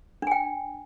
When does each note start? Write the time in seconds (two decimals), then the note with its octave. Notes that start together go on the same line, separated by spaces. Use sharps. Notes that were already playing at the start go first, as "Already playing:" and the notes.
0.22 D4
0.27 G#5
0.31 G5